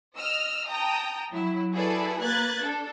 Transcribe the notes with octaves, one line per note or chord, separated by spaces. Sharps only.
D#5 E6 F6
G5 A5 A#5 D#6
F#3 E4
E4 F#4 G#4 A4 B4 D5
A#3 B4 F#6 G#6 A6
D4 A4